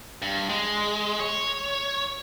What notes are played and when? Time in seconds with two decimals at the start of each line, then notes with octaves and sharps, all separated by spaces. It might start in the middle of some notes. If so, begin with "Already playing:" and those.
0.22 G2
0.49 G#3
1.20 C#5